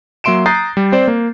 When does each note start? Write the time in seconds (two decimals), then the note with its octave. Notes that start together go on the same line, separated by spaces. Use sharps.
0.24 F#3 A#3 E5 C6 D7 E7
0.46 A#5 D#6 F#6 G6 A6 C7
0.77 G3
0.92 C4 C5 D5
1.08 A#3